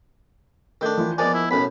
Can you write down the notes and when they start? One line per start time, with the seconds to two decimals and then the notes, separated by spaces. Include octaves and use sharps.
0.81 D#3 A3 D4 D#5 G6
0.98 E3 F3
1.18 F3 G#3 A#3 B3 D5 D#5 G#5
1.34 E4
1.51 B1 F#2 A2 B5